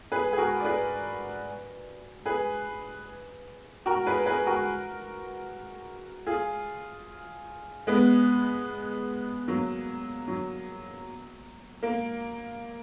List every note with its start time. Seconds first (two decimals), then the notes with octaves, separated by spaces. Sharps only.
0.12 G#4 B4
0.33 G#4
0.38 F#4 A#4
0.60 D5
0.65 G#4 B4
2.26 G#4 B4
3.86 F#4 A#4
4.06 G#4 B4
4.26 G#4 B4
4.47 F#4 A#4
6.26 F4 G#4
7.87 G#3 B3
9.48 F#3 A#3
10.28 F#3
11.83 A#3